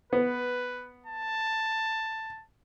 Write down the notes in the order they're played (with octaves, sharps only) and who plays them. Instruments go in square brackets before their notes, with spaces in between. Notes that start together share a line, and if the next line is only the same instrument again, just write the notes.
[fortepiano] B3 [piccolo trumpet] B4
[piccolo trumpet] A5